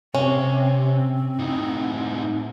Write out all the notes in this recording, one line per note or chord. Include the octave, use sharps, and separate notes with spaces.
C3 C4 C#4
A2 D#4